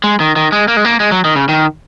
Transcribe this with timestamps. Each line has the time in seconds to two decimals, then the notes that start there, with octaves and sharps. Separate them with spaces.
0.04 G#3
0.20 D#3
0.36 D#3
0.52 G#3
0.68 A#3
0.77 G#3
0.85 A#3
1.00 G#3
1.11 F#3
1.25 D#3
1.36 C#3
1.49 D#3